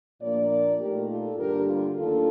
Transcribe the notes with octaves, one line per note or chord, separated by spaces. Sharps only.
A#2 F3 A#3 D4 A#4 D5
A#2 A3 D#4 G4 A#4
F4 A4
G2 D3 G3 A#3 D4 G4 A#4
F4
D#2 D#3 A#3 D4 F4 A4